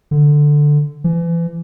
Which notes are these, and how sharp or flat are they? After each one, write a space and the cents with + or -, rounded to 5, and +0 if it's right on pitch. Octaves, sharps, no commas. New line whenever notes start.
D3 +5
E3 +35